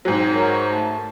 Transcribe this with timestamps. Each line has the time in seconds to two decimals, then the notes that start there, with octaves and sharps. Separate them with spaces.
0.05 G#2 F#3 C4
0.34 F#4 A#4 C#5
0.70 A3 A5